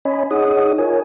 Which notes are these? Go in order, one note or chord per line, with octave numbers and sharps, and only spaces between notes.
C#4 C#5 D#5 G#5 B5
D#4 G#4 C#5 D#5 F#5 D#6
F4 A#4 C#5 G#5